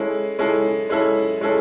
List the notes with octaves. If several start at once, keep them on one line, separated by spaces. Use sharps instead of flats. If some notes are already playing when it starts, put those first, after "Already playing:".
Already playing: G#3 C#4 E4 A4
G#3 C#4 E4 A4
G#3 C#4 E4 A4
G#3 C#4 E4 A4